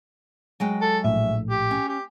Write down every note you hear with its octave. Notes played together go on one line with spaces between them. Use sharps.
F#3 G#3 G5
A4
A#1 A2 E5
G4
C#4
G4